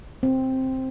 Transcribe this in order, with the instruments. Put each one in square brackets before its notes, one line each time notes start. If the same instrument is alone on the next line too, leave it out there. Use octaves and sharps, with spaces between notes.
[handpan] C4